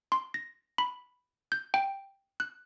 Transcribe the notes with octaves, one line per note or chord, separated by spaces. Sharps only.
C6
A#6
B5
G6
G5
F#6